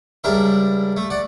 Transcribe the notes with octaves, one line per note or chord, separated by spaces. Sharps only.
C#2 G3 D4 A#4 E5
A3
D5 F#5